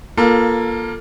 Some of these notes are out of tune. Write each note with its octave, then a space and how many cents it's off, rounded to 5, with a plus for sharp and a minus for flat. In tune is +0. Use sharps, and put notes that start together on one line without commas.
A#3 +20 F4 +0 A4 +20